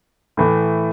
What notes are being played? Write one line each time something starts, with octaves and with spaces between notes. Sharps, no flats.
A2 E3 A3